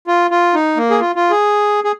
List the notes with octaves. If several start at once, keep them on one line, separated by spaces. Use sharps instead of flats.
F4
F4
D#4
A#3
G#4
F4
F4
G#4
G#4